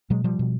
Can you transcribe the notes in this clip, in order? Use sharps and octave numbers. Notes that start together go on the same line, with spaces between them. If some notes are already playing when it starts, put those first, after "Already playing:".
B2 F#3 G#3
F3 G3
B2